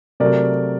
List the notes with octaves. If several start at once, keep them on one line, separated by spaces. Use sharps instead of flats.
C3 F#3 A3 A#4 D5